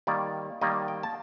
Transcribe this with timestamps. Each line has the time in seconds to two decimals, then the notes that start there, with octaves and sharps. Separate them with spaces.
0.07 D#3 G3 A#3 D5
0.61 D#3 G3 A#3 D#5
0.88 G5
1.03 A5